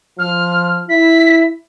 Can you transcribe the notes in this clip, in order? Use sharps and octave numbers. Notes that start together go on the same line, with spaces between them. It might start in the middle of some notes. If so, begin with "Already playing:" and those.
F3 F6
E4 B6